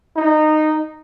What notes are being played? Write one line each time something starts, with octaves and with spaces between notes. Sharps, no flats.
D#4